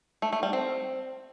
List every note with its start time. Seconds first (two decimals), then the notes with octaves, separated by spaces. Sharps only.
0.22 A3
0.33 A3
0.43 G3
0.53 C4